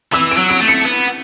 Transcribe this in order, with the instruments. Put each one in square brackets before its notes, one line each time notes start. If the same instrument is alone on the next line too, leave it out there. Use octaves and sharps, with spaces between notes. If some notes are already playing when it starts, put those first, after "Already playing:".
[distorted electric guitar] E3 [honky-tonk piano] E6
[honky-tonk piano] D7
[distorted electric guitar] F#3
[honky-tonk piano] D7
[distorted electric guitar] A3
[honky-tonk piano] C#7
[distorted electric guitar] B3